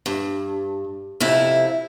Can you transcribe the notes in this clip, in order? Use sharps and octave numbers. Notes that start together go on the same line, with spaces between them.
G2
F2 C3 E4